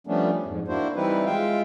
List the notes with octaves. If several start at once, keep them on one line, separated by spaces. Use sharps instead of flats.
F3 G3 A3 B3 C#4 D4
F2 G#2
A#3 D4 E4 F#4 C5
E3 G3 C4 D#4 E4 B4
G#3 F4 E5 F5 G5